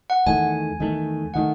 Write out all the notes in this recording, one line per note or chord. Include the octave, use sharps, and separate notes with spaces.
F#5
E2 D#3 A3 G#5
E2 D#3 A3
D#3 A3 F#5